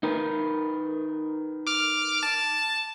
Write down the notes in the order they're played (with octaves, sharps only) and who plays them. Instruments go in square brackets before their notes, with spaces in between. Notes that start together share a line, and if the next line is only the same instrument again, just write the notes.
[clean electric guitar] D#4 A#4 B4
[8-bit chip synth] D6 F6
A5